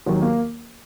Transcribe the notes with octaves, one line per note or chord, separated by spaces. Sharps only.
D#2 D#3 F#3
A#3